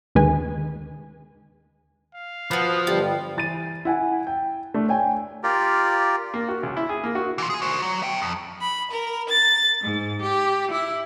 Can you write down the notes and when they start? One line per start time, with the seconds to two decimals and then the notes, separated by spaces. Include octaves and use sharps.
0.15 D#2 D3 D#3 G#3 B4 G#5
2.15 F5
2.51 F3 B3 F#4
2.87 G1 G3 F4
3.36 E3 A6 D#7
3.85 E4 F#5 G#5
4.27 G5
4.74 A3 D4
4.88 C#5 G5 G#5
5.43 F4 G4 A#4 D5
6.34 A#3
6.48 F#4
6.63 C#2
6.77 E4
6.89 G#4
7.04 A#3
7.15 F#4
7.38 E3 F4
7.50 G#4 G#5
7.62 F#4 C5
7.82 F#3
8.02 E5 G5
8.22 F2
8.60 B5
8.90 A#4
9.28 A6
9.81 G#2
10.21 G4
10.70 E4